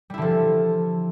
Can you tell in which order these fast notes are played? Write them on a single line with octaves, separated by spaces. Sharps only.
G3 E4 D3 F3